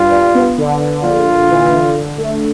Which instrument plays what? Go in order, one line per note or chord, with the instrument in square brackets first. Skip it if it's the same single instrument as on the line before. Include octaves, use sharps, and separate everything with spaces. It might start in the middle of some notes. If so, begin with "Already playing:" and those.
Already playing: [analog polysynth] G2 G3 [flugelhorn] F4
[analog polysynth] G2
B3
D3
D3
[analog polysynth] A#1 [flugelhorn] F4
[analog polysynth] A#1
E3
D3
D3
A3